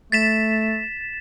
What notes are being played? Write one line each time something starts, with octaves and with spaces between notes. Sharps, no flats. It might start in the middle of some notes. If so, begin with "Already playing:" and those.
A3 A6 B6 E7